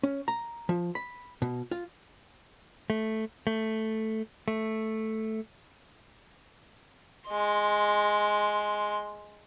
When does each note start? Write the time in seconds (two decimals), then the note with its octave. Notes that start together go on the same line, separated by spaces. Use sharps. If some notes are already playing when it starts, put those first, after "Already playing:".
0.03 C#4
0.28 A#5
0.69 F3
0.95 B5
1.42 B2
1.71 F4
2.90 A3
3.47 A3
4.48 A3
7.30 G#3 C6